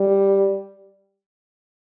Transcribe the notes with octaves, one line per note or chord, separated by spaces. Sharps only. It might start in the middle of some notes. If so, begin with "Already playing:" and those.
Already playing: G3